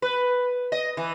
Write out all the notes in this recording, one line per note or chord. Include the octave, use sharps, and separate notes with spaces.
B4
D#5
E3